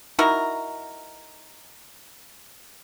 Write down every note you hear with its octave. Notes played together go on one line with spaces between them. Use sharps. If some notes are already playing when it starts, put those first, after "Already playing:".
D#4 E4 F#4 A#4